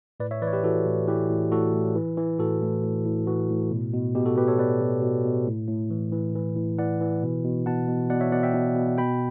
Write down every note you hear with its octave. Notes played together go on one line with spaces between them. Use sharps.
A2 B4 D5
C#5 E5
E3 B4 D5
C#5
G4 B4
E3 F#4 A4
A2
E3 G4 B4
A2
A2 F#4 A4
A2
E3
E3
A2 F#4 A4
A2
A2
A2
E3 F#4
A2
B2
B2
B2 G4
F#4 A4
B2 G4 B4
A4 C#5
B2 B4 D5
B2
B2
B2
A2
A2
E3
E3
E3
A2
E3 D5 F#5
E3
B2
B2
B2 F#5 A5
B2
B2 D5 F#5
C#5 E5
B2 D5 F#5
E5 G5
B2
B2
B2 G5 B5